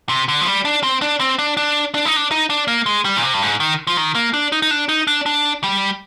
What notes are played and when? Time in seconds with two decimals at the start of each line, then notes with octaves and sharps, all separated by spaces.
0.09 C3
0.28 D3
0.41 F3
0.47 G3
0.65 D4
0.83 C4
1.02 D4
1.20 C4
1.39 D4
1.57 D4
1.94 D4
2.05 D#4
2.16 D4
2.31 D#4
2.50 D4
2.68 A#3
2.86 G#3
3.05 G3
3.17 A#2
3.23 C3
3.34 G2
3.42 G#2
3.60 D#3
3.87 F3
3.97 D#3
4.15 A#3
4.34 D4
4.52 D#4
4.62 D#4
4.71 D4
4.89 D#4
5.07 D4
5.26 D4
5.64 G3